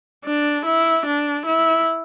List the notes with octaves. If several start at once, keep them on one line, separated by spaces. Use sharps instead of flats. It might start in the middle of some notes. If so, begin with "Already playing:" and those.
D4
E4
D4
E4